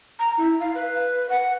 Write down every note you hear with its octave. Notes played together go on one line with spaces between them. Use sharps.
A#5
E4
F5
B4
F#5